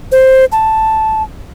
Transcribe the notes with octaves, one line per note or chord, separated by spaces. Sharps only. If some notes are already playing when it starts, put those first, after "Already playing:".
C5
A5